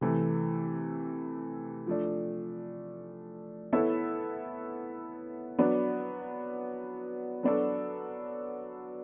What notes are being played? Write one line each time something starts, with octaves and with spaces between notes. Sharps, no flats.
C3 E3 A3
F3 A3 D4
B3 E4 A4 C#5 E5
F#3 B3 D4
F#3 B3 D4 F#4 A4